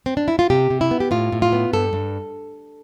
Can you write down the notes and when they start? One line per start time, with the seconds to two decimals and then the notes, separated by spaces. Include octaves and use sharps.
0.06 C4
0.17 D4
0.28 E4
0.39 F4
0.50 C3 G4
0.70 C3
0.81 E4
0.91 B3
1.00 G4
1.11 A2 F4
1.32 A2
1.42 F4
1.52 B3
1.73 G2 A4
1.93 G2